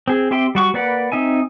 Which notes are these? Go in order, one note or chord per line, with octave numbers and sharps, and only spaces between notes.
C4 G#4
C4 G4 E5 G5 C6
G3 F#4 C#6
A#3 B4 D5 F#5 B5
C4 D#4 E5 G#5